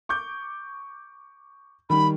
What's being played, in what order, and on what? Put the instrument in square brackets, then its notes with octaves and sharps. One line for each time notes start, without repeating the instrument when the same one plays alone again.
[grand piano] C#6 D6 G6
[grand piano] D#3 G3 [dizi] B5